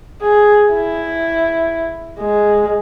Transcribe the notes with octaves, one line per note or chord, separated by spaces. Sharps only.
G#4
E4
G#3